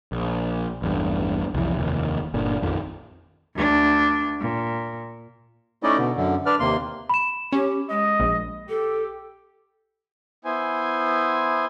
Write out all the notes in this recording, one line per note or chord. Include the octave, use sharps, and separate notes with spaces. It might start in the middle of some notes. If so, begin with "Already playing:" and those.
A#1
A1 E2 G2
C2 F2 E3
F1 D#2
G1 A#2 D3
A#1 F2 D#3 F3
D2 D4
A#2
A3 C#4 D#4 E4 D5 D#5
B2 D3
F#2 D3
D4 B4 D5 F6
D#2 C3 A#3 C6
B5 E7
C#4 G4
G#3 D#5
A#1
G4 A4
B3 E4 C5 G#5